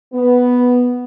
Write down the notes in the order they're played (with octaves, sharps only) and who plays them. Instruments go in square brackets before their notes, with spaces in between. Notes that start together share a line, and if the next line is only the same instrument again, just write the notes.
[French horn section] B3